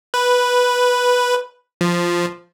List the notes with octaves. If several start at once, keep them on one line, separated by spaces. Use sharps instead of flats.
B4
F3